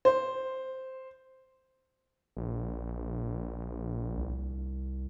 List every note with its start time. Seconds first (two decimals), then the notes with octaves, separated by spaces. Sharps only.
0.05 C5
2.37 A#1
4.17 C2